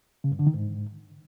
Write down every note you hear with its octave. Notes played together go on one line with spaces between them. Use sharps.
C#3
G2
D3
D#3
G#2